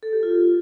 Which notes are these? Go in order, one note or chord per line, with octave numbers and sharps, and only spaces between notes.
A4
G4
F4